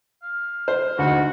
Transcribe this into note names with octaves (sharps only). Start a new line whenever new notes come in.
F5
C5
D2 G#3 D#4 F#4